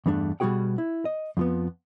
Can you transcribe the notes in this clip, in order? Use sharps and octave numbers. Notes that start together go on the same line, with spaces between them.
E2 G2 A3 D4
B2 G3 C#4 F#4 G#4 G5
E4
D#5
F2 F3 B3